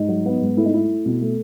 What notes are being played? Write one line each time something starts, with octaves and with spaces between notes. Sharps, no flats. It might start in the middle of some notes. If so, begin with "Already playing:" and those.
Already playing: G#2 D#4
F#3
B3
G#2
A3 E4
D#4
A3 E4
A3
B2
A3